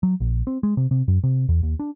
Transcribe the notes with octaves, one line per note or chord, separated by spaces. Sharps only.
F#3
A#1
C4
G#3
C3
C3
F#2
C3
E2
D#2
D4